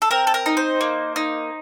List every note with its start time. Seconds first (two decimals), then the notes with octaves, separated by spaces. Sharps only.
0.02 A4
0.11 C4 A#4
0.27 A4
0.34 A#4
0.46 D#4
0.57 C5
0.81 A#3
1.16 D#4